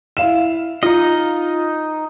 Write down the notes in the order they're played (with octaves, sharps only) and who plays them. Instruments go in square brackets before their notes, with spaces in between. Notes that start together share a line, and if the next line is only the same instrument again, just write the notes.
[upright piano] E4 F5 E7
[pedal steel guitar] D#4 D#5 [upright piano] F4